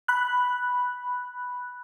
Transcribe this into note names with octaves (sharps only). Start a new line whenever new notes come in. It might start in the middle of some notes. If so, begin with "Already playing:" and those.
B5 F#6